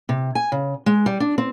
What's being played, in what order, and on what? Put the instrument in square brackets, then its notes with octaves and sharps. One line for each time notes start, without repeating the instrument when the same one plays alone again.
[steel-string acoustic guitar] C3
G#5
C#3
G#3
G3
D4
C4